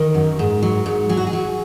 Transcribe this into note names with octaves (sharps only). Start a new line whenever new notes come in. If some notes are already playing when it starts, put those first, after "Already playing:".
Already playing: D#3
F#2
G#2
F#3
G#2
F#3 G#4
F#4
G#4
F#3